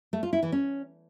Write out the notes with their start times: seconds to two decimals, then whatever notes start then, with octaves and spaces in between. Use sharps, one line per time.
0.13 A3
0.23 F4
0.33 E4
0.43 E3
0.52 C#4